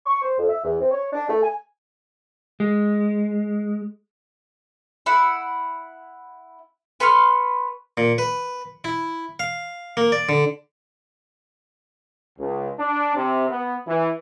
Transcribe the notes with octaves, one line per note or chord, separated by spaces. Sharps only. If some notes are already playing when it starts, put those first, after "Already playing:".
C#6
C5
F2
E5
E2
C4
C#5
D4
A3
G#5
G#3
E4 F#5
B4 C6 C#6 F6
A#2
B4
E4
F5
A#3
D5
D3
C#2
D4
C3
B3
E3